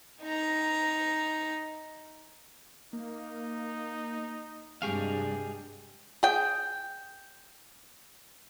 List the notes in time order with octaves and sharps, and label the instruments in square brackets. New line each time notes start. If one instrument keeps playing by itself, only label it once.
[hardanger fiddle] D#4 A#5
[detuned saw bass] A#3 [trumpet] D#4
[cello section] G2 G#3 D4 [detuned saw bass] C3 [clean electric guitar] G4 G#4 F5
[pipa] G#4 G5